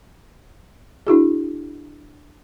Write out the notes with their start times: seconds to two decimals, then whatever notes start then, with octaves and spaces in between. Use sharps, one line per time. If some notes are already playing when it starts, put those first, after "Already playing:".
1.07 D4 E4 F#4 G#4